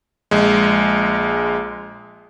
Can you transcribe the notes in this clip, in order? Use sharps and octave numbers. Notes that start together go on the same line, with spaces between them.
A#1 G#3